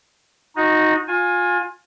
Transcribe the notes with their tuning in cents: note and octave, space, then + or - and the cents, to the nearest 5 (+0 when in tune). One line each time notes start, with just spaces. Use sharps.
D#4 +0 F#4 -25
F4 +30 G#5 +0